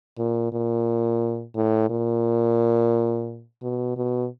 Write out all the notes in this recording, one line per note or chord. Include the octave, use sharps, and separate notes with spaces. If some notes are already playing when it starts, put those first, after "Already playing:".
A#2
A#2
A2
A#2
B2
B2